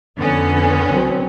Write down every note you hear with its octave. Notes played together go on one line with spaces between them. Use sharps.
F2 D3 B3 C#4
C2 F#3 C4